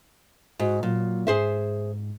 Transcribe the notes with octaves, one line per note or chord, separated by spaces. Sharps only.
G#2 F#4
A#2 F#3
G#2 G#4 C5 E5